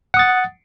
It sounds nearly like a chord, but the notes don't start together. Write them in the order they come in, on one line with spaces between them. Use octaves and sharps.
F#5 D#6 A6